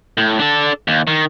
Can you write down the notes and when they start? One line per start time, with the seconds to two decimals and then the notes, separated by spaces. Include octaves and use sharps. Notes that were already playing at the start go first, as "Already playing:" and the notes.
0.17 A2
0.39 D4 A4
0.88 D#2
1.07 D#3